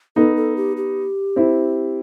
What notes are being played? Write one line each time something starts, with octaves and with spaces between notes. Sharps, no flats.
B3 D#4 A4
A4
G4
G4
C4 E4